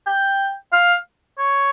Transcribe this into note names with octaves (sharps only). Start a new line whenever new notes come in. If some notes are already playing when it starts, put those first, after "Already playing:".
G5
F5
C#5